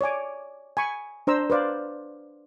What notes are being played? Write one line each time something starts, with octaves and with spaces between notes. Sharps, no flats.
C#5 D5 G#5 D6
G#5 B5 C#6
D4 C5 A#5 E6
B4 C5 D5 F5